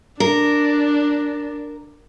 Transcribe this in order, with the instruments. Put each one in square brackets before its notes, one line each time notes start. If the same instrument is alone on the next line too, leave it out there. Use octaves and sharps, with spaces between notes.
[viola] D4 [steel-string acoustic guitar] A#4